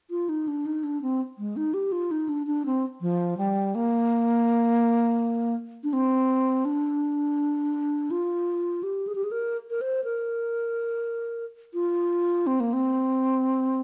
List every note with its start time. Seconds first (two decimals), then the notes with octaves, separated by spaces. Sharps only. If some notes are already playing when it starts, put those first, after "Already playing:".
0.10 F4
0.29 D#4
0.48 D4
0.66 D#4
0.83 D4
1.02 C4
1.38 G#3
1.56 D#4
1.74 G4
1.92 F4
2.11 D#4
2.29 D4
2.47 D4
2.66 C4
3.01 F3
3.37 G3
3.75 A#3
5.84 D4
5.93 C4
6.65 D4
8.11 F4
8.83 G4
9.07 G#4
9.15 G4
9.24 G#4
9.32 A#4
9.70 A#4
9.81 C5
10.04 A#4
11.74 F4
12.47 C4
12.60 A#3
12.73 C4